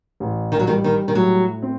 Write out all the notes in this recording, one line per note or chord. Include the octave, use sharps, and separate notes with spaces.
A1
D#3
F#3
D#3 G3
D#3
D#3
A2 F#3
C4